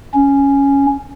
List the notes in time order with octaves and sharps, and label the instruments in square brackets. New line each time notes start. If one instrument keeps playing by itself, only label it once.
[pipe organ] C#4